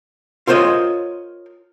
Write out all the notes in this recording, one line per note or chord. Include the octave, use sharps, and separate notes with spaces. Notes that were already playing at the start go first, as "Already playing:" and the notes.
F4 A#4 C5 C#5 D#5